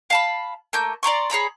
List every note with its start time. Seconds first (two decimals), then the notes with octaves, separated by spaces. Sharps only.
0.10 F5 A5 B5
0.73 A3 A#3 G6
1.03 D5 A#5 C6 C#6
1.30 G#4 C#5 A#5 B5